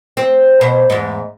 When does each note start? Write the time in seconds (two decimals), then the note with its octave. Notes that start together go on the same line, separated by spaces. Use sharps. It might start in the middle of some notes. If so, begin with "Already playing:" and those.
0.17 C4
0.61 B2 C5
0.90 E2 G#2